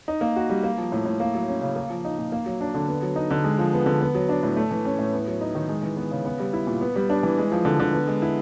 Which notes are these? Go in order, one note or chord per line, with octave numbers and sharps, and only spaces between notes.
D#4
A#3
F#4
G3
A#3
F3
A2
A2
A#3
F#3
C#4
C#3
A#3
F3
D#4
A#2
A#3
F#3
D4
D3
B3
F#3
D#4
D3
G#3
F3
B3
D3
B3
F#3
D4
A2
A3
E3
C#4
A2
B3
F#3
D#4
D#3
G#3
E3
B3
C#3
B3
G3
E4
A#2
B3
G3
D4
E3
G#3
F3
D3
D3
B3
G#3
E4